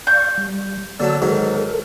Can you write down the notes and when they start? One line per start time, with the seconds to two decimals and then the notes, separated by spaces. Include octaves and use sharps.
0.07 D5 F5 C#6 G6
0.38 G3
1.00 D3 F#3 A#3 A4 D5 E6
1.22 G#2 D#3 F#3 A4 A#4